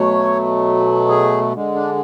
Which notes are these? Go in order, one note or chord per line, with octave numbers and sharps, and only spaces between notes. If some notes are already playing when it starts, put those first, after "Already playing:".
Already playing: B2 F#3 A3 C#5
G#4
D3 G#3
D4